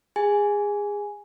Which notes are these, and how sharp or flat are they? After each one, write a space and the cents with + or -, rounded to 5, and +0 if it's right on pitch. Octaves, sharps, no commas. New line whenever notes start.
G#4 -25 G#5 +0